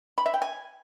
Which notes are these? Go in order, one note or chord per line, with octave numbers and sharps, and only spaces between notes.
B5
E5
G5
G#5